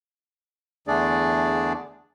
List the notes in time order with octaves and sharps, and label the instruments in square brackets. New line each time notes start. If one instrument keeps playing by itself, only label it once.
[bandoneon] E2 D3 A3 D4 G#4 D5